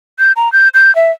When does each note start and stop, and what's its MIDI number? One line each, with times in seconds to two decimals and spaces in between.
0.19 0.32 91
0.36 0.51 82
0.53 0.69 91
0.74 0.94 91
0.96 1.11 76